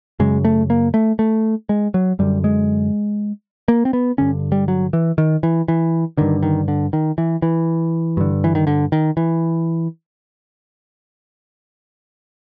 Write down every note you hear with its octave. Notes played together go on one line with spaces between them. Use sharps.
F#2 C#3 G#3
A3
A#3
A3
A3
G#3
F#3
F#2 D3 G3
G#3
A#3
C4
B3
G2 D3 C#4
G3
F#3
E3
D#3
E3
E3
G2 D3 D#3
D#3
D3
D#3
E3
E3
G2 D3
E3
D#3
D3
D#3
E3